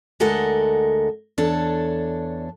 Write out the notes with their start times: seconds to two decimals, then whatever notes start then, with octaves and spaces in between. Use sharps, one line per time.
0.20 D2 G#3 A4 A#4 D#5 F#5
1.38 E2 D4 A4 C#5 A5